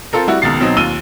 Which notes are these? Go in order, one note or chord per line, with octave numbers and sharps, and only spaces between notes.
C4 F4 A4 A#4
G3 E4 F#4
C#2 B2 D#3 A6 C7
B2 F#3 C4 D#4
D#2 F4 E6 D#7 G7